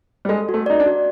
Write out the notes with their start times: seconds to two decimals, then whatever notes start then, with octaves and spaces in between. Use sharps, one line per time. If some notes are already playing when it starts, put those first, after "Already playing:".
0.25 G3
0.29 G#3 A4
0.49 F#4
0.54 A3
0.66 D#4 D5
0.80 D4
0.86 F#4